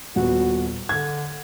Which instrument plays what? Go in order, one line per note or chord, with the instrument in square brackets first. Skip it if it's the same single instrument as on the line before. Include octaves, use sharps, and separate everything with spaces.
[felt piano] D#1 B3 [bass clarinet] F#4
[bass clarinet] D3 [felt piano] G#6